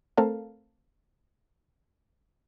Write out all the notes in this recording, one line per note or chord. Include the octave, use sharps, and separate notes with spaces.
A3 C4 A4 A#4 F5